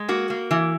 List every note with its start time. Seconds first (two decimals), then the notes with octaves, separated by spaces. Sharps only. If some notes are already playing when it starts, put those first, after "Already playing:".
Already playing: G#3
0.09 A#3 F#4
0.30 A#3
0.51 E3